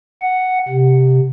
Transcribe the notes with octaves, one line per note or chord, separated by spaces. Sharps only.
F#5
C3